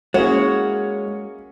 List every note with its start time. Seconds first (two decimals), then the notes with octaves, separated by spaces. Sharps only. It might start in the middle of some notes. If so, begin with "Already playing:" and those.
0.14 G#3 A#3 C#4 E4 F#4 G#4 C#5